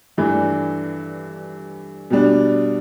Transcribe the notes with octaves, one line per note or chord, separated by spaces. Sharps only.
G2 E3 A3 D4
B2 G3 D4